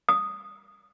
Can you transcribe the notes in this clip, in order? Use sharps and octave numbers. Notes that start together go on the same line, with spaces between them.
D#6